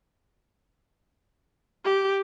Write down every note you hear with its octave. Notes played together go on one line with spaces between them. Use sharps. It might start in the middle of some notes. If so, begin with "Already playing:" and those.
G4